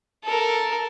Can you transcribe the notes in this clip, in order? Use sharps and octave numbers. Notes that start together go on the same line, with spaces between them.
A4 A#4